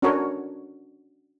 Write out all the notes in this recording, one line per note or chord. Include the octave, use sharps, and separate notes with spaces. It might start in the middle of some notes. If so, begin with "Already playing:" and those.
C#4 D4 F#4 A4 A#4 C#5